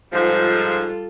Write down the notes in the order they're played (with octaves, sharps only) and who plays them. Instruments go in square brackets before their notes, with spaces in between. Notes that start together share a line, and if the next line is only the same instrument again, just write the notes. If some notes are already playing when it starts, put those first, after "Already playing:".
[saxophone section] G#2 F3 [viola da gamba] G3 F4 A4